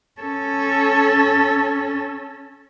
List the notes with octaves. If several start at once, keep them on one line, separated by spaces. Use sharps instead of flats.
C#4 A4